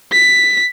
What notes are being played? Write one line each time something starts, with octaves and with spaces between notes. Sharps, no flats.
B6